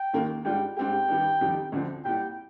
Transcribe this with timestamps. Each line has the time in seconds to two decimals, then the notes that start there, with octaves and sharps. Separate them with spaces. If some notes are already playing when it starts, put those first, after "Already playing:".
Already playing: G5
0.13 D#2 D#3 A#3
0.45 G#2 G3 D4 F4 G5
0.76 G#2 G3 C4 G4 G5
1.08 G2 D#3 G3
1.41 F2 C3 D#3 G3
1.72 D2 D3 F3 C4
2.05 C2 A#2 G3 G5